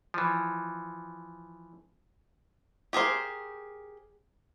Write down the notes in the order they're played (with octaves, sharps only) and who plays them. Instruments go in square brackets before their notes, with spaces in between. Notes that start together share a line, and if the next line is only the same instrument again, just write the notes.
[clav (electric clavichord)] E3 F3
[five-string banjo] G4 G#4 A#4 C5